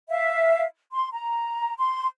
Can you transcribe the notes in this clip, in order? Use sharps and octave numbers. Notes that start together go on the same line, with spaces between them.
E5 F5
C6
A#5
C6